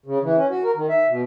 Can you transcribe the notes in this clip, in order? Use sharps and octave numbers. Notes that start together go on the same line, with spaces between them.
C#3
E3
C#4
F#4
A#4
D#3
E5
B2